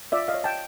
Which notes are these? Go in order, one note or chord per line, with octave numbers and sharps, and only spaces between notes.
F4 D5 E5
D#5 F5
C#5
G5 A5